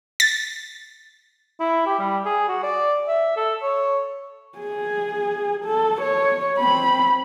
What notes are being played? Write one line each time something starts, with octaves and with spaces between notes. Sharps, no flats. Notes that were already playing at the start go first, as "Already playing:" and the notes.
A6
E4
G4
G3
G#4
F#4
D5
E5
A4
C#5
G#4
A4
C#5
C4 B5